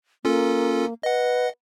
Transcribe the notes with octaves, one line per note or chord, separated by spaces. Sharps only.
A#3 C#4 F4 A4
B4 D#5 F#5